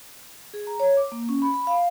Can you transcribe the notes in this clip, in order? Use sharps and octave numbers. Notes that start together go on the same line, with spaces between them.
G#4
A#5
C#5
D6
A#3
C#4
B5
B5
F5